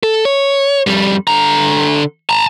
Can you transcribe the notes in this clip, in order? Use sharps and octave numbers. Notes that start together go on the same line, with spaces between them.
A4
C#5
F2 G3
D3 A#5
A5 A#5